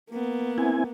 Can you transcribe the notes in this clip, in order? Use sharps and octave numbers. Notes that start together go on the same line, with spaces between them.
A#3 B3
C4 E4 G#5